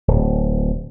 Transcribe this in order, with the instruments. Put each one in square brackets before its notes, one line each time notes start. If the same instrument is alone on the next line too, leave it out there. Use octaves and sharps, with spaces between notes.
[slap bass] D1